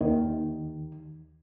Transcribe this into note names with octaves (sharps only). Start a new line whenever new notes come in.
D#2 D#3